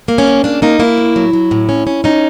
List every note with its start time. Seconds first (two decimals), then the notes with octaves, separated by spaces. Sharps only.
0.08 A#3
0.18 C#4
0.27 C#3
0.44 A#3 D4
0.62 A#3 D#4
0.79 A#3 E4
0.97 A2
1.16 F#3
1.33 F#3
1.51 A2
1.69 C#4
1.87 C#4
2.04 C#4 D#4